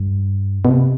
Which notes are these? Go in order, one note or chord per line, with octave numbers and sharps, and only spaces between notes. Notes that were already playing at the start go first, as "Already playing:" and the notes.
Already playing: G2
B2
C3